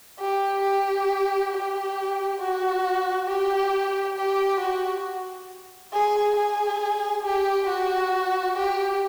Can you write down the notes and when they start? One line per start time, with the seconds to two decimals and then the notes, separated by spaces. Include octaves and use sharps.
0.19 G4
0.63 G4
1.52 G4
2.40 F#4
3.27 G4
4.17 G4
4.60 F#4
5.93 G#4
6.36 G#4
7.25 G4
7.68 F#4
8.56 G4